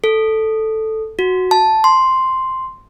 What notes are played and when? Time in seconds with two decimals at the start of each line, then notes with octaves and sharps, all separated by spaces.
0.04 A4
1.19 F#4
1.51 A5
1.84 C6